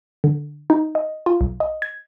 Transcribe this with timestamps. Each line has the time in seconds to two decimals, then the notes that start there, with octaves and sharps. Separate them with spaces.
0.24 D3
0.70 D#4
0.95 D#5
1.26 F4
1.41 B1
1.60 D#5
1.82 G#6